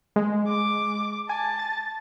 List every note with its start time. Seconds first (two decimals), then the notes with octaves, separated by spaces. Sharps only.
0.16 G#3
0.48 D6
1.29 G#5 A5
1.59 A6